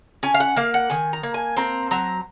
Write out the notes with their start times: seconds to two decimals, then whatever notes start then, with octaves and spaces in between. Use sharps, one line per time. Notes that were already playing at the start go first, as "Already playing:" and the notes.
0.23 C#4 G#5
0.34 F5
0.40 F#5
0.56 A#3 F5
0.74 F#5
0.90 D#3 G#5
1.13 A#5
1.23 A#3
1.34 G#5
1.57 C4 A#5
1.91 F#3 A#5